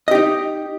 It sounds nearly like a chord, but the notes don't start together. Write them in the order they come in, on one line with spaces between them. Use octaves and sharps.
D#5 G4 D#4